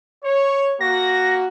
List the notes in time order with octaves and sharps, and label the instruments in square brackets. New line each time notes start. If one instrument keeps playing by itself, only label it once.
[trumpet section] C#5
[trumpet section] A#3 F#4 [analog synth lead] A#6